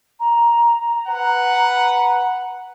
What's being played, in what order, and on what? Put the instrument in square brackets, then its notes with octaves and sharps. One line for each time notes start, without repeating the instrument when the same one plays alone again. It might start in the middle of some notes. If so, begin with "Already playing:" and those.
[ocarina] A#5
[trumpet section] B4 F#5